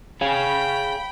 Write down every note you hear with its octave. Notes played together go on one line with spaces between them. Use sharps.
G#4 C#5 F5 G5 B5